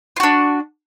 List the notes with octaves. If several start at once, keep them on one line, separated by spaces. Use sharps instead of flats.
D4 F4 F#4